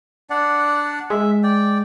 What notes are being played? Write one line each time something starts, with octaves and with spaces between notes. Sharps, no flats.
D4 D5 F#5
G#3 E5
D5 G5